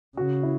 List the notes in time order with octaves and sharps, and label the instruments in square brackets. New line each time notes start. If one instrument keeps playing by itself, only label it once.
[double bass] C#3 [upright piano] F#4
[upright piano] E4